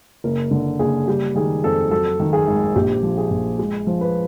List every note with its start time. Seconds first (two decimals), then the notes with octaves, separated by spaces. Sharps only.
0.24 F#1 A#4
0.51 D3
0.79 F#1 G#4
1.08 G3 G4
1.35 D#3 G#4
1.64 F2 A4
1.91 F#3 A4
2.20 D#3
2.33 G#4
2.47 G#1
2.76 A#1 G4
3.03 F3
3.18 G#4
3.31 A#1
3.59 G#3
3.87 F3
4.01 B4